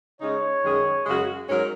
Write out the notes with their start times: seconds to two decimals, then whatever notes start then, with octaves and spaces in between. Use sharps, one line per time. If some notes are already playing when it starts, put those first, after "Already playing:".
0.21 C#3 G#3 D#4 C#5
0.63 F#2 D#3 G#3 C#4 G#4
1.06 F#2 C#3 G#3 C#4 F#4
1.49 G#2 F#3 C#4 A#4